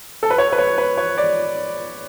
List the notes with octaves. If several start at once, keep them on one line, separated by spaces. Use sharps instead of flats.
A4
B4
C#5
B4
C#5
B4
C#5
D5